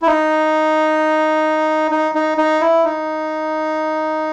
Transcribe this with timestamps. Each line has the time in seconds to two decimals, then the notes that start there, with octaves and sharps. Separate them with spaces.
0.02 E4
0.07 D#4
1.91 D#4
2.15 D#4
2.38 D#4
2.61 E4
2.84 D#4